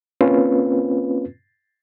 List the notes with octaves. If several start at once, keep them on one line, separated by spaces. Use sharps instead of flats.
A#3 C4 C#4 F4 B4